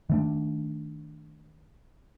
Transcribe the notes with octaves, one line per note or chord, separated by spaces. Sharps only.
D#3 A3 D4